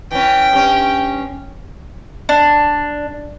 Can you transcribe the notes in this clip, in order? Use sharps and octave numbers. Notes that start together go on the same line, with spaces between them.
E3 C#4 G5
G2 C#4
D4